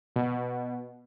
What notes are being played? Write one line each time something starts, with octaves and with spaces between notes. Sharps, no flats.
B2